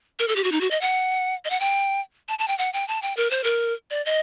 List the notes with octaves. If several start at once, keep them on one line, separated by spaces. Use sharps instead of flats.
A#4
A4
G4
F#4
D#4
F#4
D#5
F#5
D#5
F#5
G5
A5
A5
G5
F#5
G5
A5
G5
A#4
C5
A#4
D5
D#5